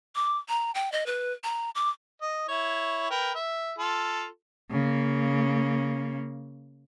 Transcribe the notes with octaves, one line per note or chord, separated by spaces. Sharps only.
D6
A#5
G5
D#5
B4
A#5
D6
D#5
E4 C#5
A#4 B4 G5
E5
F4 A4
C#3 A#3